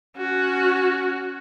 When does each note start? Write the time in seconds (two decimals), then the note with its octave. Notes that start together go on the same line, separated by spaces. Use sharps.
0.17 C#4 F#4